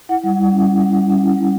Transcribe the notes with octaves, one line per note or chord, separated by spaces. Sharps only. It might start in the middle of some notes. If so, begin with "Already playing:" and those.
E4 F#5
G3
G3
C#4
E4
G3
G3
C#4
E4
G3